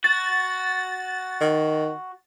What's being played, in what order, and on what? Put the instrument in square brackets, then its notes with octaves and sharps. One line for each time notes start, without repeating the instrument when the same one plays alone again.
[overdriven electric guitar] F#4 [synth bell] A6
[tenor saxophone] D#3